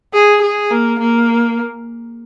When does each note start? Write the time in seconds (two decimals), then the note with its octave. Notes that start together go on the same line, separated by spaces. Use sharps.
0.14 G#4
0.42 G#4
0.71 A#3
1.00 A#3